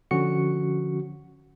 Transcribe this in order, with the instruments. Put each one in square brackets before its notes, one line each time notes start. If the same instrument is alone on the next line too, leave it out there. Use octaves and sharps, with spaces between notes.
[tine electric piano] D3 F3 C#4 F#4 C#7